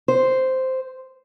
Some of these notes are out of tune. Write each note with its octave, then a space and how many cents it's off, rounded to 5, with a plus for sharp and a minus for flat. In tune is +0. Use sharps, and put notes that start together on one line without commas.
C5 -5